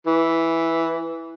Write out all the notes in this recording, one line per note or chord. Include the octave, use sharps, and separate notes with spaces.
E3